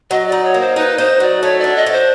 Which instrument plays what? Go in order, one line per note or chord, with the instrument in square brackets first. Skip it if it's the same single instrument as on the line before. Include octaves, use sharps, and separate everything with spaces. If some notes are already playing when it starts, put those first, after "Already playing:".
[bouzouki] F#3 [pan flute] D#5
[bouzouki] D#4 [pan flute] D5
[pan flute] C#5
[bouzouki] A#3
[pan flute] C5
[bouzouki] D#4 [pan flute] B4
[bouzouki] D#4 [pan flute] C5
[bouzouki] F#3 [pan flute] D5
[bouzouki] A3 [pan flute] C#5
[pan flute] D5
[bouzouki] D4
[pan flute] D#5
[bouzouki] D4
[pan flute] C5